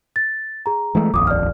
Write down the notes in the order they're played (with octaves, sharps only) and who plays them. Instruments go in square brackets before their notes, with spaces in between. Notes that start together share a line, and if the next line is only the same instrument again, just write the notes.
[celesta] A6
G#4 A#5
[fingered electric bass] E3 G#3 A3
[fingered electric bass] D#1 A#1 F2 [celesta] D6 D#6
[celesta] D5 F6